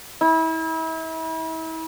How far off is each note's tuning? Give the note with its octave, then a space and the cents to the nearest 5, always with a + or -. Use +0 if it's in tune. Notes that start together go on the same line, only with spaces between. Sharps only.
E4 -35